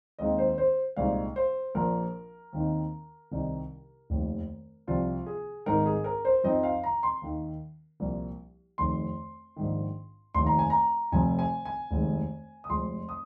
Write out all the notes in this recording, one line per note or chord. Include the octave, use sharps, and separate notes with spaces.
D#2 D#3 G#3 C4 D#4 D#5
C5
C5
C2 A#2 G#3 D#4 F5
C5
A#1 A#2 F3 A#3 A#4
D#2 D#3 C4 D#4
C2 C3 D#3 C4 D#4
F1 D#2 D#3
C2 C3 F3 F4
G#4
G#1 G#2 G#3 D#4 A#4
G#4
A#4
C5
F2 F3 C4 D#4 D#5
F5
A#5
C6
D#2 D#3 A#3
C2 A#2 F3 A#3
F1 F2 D#3 C6
A#1 G#2 D#3
F1 D#2 D#3 C6
A#5
G#5
A#5
F1 F2 C3 F3 G#5
G#5
G#5
F1 D#2 D#3 G#3
D#6
F1 F2 F3 G#3 C6
D#6